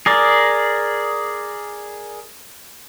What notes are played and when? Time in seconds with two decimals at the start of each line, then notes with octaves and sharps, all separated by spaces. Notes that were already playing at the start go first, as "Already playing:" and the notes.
0.06 G#4 A#4 D5